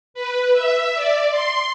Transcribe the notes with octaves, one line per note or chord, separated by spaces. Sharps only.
B4
E5
D5
C6